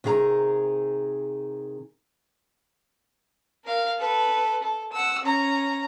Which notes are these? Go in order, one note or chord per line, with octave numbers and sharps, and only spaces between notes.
C3 D#3 G#4 E5 A#5
A#4 F5
A4 B4
A4
F#5 E6
C#4 A#5